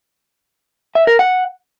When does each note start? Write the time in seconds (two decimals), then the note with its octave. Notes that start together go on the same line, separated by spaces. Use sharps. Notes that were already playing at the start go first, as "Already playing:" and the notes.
0.95 E5
1.07 A#4
1.19 F#5